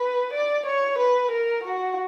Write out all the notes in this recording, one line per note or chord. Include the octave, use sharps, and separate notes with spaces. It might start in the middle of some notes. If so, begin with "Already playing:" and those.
Already playing: B4
D5
C#5
B4
A#4
F#4